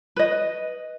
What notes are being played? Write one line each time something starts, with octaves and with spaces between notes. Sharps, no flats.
B4 D#5